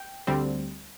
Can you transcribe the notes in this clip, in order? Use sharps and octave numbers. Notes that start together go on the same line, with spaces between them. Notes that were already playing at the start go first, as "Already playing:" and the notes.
Already playing: G5
D2 D3 G3 C4